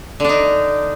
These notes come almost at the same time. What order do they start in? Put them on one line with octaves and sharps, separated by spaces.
D3 D4 D#4